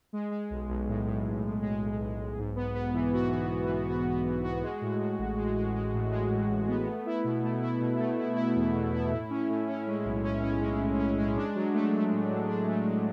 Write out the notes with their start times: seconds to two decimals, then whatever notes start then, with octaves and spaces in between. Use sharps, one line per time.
0.13 G#3
0.31 G#3
0.50 B1
0.69 B1
0.88 A2
1.07 A2
1.25 B1
1.44 A2
1.62 G#3
1.81 B1
2.00 B1
2.19 B1
2.38 G#2
2.56 B3
2.75 B3
2.93 E3
3.13 F#4
3.31 E3
3.50 E3
3.69 E3
3.87 F#4
4.06 B3
4.25 E3
4.44 F#4
4.63 G#3
4.81 A2
5.00 A2
5.19 A1
5.37 G#3
5.56 G#3
5.75 G#3
5.94 A2
6.12 G#3
6.30 A2
6.49 A1
6.68 B3
6.87 A3
7.06 E4
7.24 B2
7.43 A3
7.62 E4
7.81 B2
7.99 A3
8.18 E4
8.36 E4
8.55 E2
8.74 B2
8.93 E4
9.12 A2
9.30 C#4
9.50 A2
9.68 C#4
9.87 G#3
10.05 B1
10.24 C#4
10.43 C#4
10.61 G#3
10.80 A2
10.99 C#4
11.18 G#3
11.36 D4
11.55 F#3
11.74 A3
11.92 A3
12.12 A2
12.30 A2
12.48 D4
12.67 A3
12.86 F#3